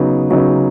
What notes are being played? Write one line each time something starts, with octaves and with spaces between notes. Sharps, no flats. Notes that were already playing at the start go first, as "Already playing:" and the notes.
Already playing: C#3 F#3 B3 D#4
C#3 F#3 B3 D#4